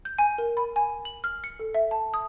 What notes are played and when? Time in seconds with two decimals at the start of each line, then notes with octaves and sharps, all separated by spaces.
0.05 G6
0.19 G#5
0.38 A#4
0.57 B5
0.76 G#5
1.05 F#7
1.24 F6
1.44 C#7
1.59 A4
1.74 E5
1.91 A5
2.14 D#6